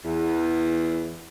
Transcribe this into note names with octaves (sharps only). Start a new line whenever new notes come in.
E2